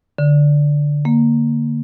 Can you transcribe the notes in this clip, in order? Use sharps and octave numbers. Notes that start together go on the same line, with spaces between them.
D3
A#3